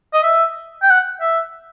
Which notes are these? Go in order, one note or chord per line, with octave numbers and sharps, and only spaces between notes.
D#5
E5
G5
F#5
E5